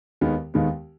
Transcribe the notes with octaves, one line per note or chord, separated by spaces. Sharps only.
D#2 D#3 G#3 B3
D#2 D#3 G#3 B3